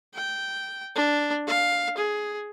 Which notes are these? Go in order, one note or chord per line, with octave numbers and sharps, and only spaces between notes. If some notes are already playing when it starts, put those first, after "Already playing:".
G5
D4
F5
G#4